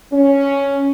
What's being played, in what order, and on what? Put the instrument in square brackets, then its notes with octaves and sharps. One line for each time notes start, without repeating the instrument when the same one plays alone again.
[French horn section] C#4